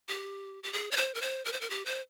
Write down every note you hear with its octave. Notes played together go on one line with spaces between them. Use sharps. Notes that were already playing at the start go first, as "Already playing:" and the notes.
G4
G4
G#4
C#5
C5
A#4
C5
A#4
C5
A#4
G4
C5